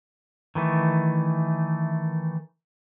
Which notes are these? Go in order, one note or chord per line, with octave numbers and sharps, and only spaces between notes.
D#3 E3 A3